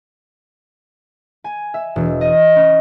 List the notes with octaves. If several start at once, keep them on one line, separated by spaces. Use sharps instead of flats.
G#5
E5
E1
D#5
C#4